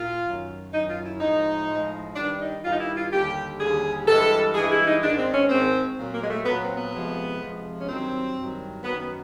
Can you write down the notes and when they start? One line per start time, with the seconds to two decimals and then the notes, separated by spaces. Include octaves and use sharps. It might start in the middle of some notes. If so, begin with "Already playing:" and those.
Already playing: A#2 F4
0.25 F#2 D#3 F#3
0.72 F#2 D#3 F#3 D#4
0.88 F4
1.05 E4
1.20 A2 F3 G#3 D#4
1.68 A2 F3 G#3
2.16 G2 D#3 G3 D4
2.40 D#4
2.63 G2 D#3 G3 F4
2.72 D#4
2.79 E4
2.96 F4
3.11 D#2 D3 G3 G4
3.59 D#2 D3 G3 G#4
4.06 G2 E3 G#3 A4
4.54 G2 E3 G#3 G#4
4.71 E4
4.86 D#4
5.02 G#2 D#3 G#3 D4
5.18 C4
5.34 C#4
5.50 G#2 D#3 G#3 C4
5.97 A#2 F#3
6.13 A#3
6.22 G#3
6.29 A3
6.45 A#2 F#3 B3
6.61 C4
6.77 B3
6.93 F2 C3 F3 G#3
7.41 F2 C3 F3 G#3
7.79 C#4
7.88 G2 D#3 F#3 C4
8.36 G2 D#3 F#3
8.84 F#2 D#3 F#3 B3
9.00 B3